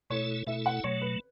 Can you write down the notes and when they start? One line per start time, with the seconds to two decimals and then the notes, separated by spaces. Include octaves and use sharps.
0.10 B2 A3 E4 A4 C#5
0.47 B2 A3 E4 A4 E5
0.66 F#5
0.84 B2 F#3 A3 C#5
1.02 B4